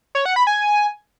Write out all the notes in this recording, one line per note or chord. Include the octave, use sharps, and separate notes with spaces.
C#5
F#5
B5
G#5